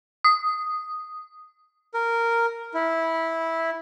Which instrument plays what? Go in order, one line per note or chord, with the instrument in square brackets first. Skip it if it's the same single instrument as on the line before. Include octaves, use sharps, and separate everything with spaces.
[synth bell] D#6
[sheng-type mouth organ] A#4
E4